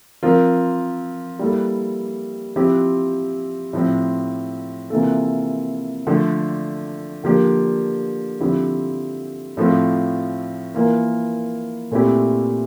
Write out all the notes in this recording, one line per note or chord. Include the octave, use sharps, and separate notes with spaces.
F3 C4 F4 A#4
G3 A#3 E4 A4
F3 C4 E4 G4
A2 F3 C4
C3 E3 A#3 F4 A4
D3 F3 A3 D4
D3 F3 A#3 D4 G4
D3 F3 C4 E4 G4
A2 F3 A3 C4 F4
E3 A#3 F4 A#4
A#2 A3 C4 E4 G4